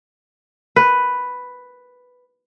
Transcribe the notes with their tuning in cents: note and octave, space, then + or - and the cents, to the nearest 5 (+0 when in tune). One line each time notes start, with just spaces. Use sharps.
B4 +5